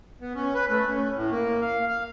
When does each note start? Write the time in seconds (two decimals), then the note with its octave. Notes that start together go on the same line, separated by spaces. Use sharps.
0.21 B3
0.35 C#4
0.54 B4
0.70 A3
0.87 C#4
1.15 A2
1.31 A#3
1.61 F5
1.88 F5